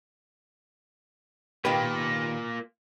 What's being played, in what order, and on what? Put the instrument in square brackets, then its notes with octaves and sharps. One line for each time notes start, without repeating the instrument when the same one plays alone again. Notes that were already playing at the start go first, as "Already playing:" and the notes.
[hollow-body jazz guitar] D#3 G4 B4 [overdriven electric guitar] A#3 F4